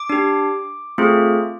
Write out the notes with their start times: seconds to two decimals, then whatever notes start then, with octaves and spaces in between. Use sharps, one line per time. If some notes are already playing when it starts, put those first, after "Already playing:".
Already playing: D6
0.10 D4 G4
0.98 A3 C4 F4 G#4